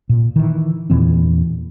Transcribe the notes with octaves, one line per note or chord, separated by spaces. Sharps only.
A#2
D#3 E3
E2 A#2 E3 C4